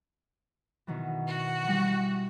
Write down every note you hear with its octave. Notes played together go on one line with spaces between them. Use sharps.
B2 D#3 E3
F#4
E3 G3 E4